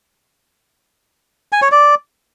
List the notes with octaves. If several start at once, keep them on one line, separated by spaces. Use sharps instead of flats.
G#5
C#5
D5